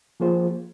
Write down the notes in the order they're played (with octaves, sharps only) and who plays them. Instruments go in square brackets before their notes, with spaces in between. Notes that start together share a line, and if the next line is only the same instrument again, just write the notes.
[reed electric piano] F3 A#3 F4 G#4 C5